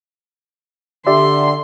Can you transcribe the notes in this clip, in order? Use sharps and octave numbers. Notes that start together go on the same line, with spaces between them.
D3 G4 D5 E5 C6